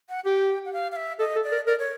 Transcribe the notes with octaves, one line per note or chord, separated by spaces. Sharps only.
F#5
G4 G5
F#5
F5
F5
E5
A4 D#5
A4
D5
A#4
A#4 D5
C#5